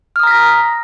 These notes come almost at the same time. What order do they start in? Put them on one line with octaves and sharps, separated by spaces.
F6 D#6 A#5 B6 A#6